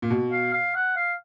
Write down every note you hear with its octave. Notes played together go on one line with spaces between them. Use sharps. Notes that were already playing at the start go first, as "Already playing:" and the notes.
A#2
B2
F5
F5
F#5
F5